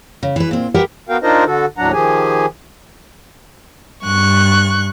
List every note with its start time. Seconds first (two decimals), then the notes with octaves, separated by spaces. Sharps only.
0.23 C#3
0.36 E3 B4
0.51 A#2 C4
0.74 G4 A#4 B4 E5 F#5
1.09 B3 F#4 A#4 F5 G5
1.23 D4 D#4 F4 A#4 C5 D#5
1.46 D3 F#4 A4
1.78 D#2 A2 F#3 D4 F#5 A#5
1.93 D#3 F3 G4 G#4 G#5
4.05 G2 C#6 F#6